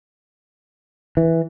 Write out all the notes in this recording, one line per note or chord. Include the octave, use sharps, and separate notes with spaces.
E3